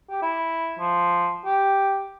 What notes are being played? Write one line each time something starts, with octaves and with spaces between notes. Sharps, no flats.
G4
E4
F3
G4